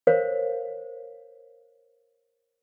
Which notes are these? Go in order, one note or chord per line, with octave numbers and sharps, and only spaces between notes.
A#4 C5 C#5 F5